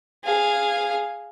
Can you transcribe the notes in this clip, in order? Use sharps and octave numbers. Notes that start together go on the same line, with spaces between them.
G#4 F5